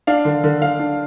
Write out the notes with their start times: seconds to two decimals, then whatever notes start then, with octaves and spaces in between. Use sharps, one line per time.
0.07 D4 F5
0.25 D3
0.44 D3
0.61 D3 F5
0.79 D4